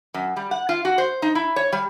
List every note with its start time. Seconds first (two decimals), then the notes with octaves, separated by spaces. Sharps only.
0.14 F#2
0.36 G3
0.51 F#5
0.69 F4
0.85 F#4
0.98 C5
1.22 D#4
1.35 E4
1.56 C#5
1.72 G3